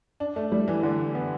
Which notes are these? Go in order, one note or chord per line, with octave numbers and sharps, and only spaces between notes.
D4
A3
G3
E3
D3
B3